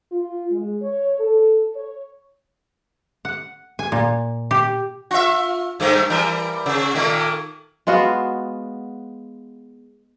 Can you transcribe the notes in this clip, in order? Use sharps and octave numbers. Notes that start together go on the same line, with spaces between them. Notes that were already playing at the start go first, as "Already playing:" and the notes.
F4
G#3
C#5
A4
C#5
F#5
G#5
A#2
G4
F4 E5
G2 A3 A#3
E3 G3 A#4
C3
A#2 D#3 A3
G#3 B3 F4 F#4